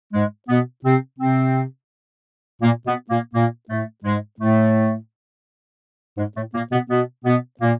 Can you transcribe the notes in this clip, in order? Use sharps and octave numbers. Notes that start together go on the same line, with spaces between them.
G#2 G#3
B2 B3
C3 C4
C3 C4
A#2 A#3
B2 B3
A#2 A#3
A#2 A#3
A2 A3
G#2 G#3
A2 A3
G#2 G#3
A2 A3
A#2 A#3
B2 B3
B2 B3
B2 B3
A#2 A#3